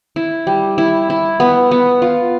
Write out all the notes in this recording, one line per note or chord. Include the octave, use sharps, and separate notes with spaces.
E4
G3
E4
E4
B3
B3
F4